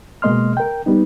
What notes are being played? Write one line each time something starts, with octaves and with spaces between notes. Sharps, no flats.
B2 G#3 A#3 D#5 C6 F6
A#4 G5
G3 B3 D#4